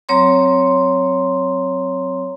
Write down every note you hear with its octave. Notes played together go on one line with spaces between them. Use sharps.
F#3 C4 C#5 A#5 C6